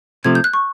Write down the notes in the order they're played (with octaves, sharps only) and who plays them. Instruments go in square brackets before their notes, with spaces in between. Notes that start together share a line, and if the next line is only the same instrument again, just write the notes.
[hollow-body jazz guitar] C3 F3 A3 [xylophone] G#6
[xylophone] G6
F#6
C#6